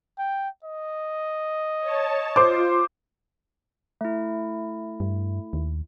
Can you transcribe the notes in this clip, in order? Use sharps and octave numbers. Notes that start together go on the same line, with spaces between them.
G5
D#5
C#5 A5
F4 C5 D6
A3 E4
G2
D#2